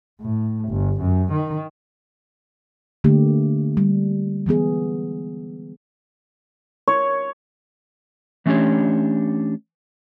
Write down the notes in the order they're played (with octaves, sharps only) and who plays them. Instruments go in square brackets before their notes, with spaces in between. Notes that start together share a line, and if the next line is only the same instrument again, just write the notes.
[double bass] A2
G1
F#2
D#3
[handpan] D3 A3 A#3 G4
G3
E3 G#3 B3 G#4
[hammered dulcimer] C#5
[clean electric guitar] E3 A3 C#4 D4 G4 C#5